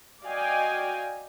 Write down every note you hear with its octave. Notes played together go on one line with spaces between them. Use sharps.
F#4 D5 D#5 F5 G5 G#5